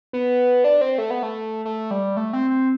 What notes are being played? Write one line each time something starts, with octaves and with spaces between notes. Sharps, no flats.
B3
D4
C4
A3
B3
A3
A3
G3
A3
C4
C4